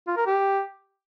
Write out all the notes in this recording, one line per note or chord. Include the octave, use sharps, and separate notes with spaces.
F4
A#4
G4